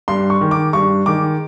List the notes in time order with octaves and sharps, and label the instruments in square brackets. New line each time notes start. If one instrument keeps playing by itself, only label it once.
[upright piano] G2 C6
C#6
D#3 G#3
D6
G2 C#6
D#3 G#3 D6